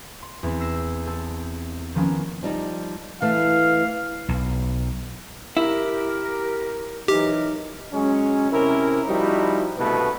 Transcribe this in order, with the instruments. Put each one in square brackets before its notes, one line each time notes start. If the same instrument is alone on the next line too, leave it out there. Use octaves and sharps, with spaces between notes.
[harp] C6
E2 C4
E6 A#6 C7 E7
C4 A4
D#3 F3 A#3 B3 C#4
[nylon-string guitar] F3 G3 D#4
[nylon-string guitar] E3 A3 [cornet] F5
[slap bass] B1
[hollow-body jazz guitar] E4 [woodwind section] G4 A#4
[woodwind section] E3 F#3 A#4 [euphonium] D#4 [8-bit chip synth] G4
[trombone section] F#3 G#3 C#4
C3 C#4 E4 A#4
F3 G3 D#4 E4 F#4
C2 G2 B2 A3 B4